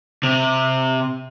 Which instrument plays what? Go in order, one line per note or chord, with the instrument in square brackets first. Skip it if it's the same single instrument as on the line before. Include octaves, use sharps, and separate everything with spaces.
[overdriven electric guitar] C3